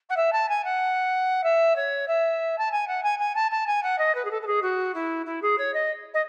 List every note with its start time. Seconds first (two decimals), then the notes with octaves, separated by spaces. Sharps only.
0.09 F#5
0.16 E5
0.32 A5
0.48 G#5
0.64 F#5
1.43 E5
1.76 C#5
2.07 E5
2.58 A5
2.71 G#5
2.87 F#5
3.03 G#5
3.19 G#5
3.35 A5
3.51 A5
3.66 G#5
3.82 F#5
3.98 D#5
4.14 B4
4.24 G#4
4.30 A4
4.42 A4
4.46 G#4
4.62 F#4
4.94 E4
5.26 E4
5.42 G#4
5.58 C#5
5.74 D#5
6.14 D#5